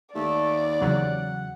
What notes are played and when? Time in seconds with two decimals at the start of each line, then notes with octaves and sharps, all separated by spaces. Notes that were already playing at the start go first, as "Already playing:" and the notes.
0.15 D#2 A3 D5
0.81 E2 C#3 F#3 F#5